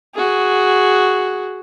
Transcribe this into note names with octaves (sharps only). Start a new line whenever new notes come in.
F#4 G#4